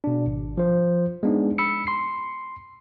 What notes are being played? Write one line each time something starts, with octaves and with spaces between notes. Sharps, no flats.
B2 D4
G#1
F3 C5
G#3 B3 D4 D#4
B5 E6 C#7
C6 C7